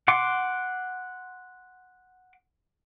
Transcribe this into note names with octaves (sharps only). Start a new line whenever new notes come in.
F#5 C6 D6